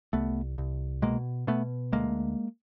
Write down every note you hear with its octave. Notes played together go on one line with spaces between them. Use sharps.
C2 A3 B3
C2
B2 G#3 A#3
B2 A3 B3
D2 G#3 A#3